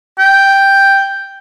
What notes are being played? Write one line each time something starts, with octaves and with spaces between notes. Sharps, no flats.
G5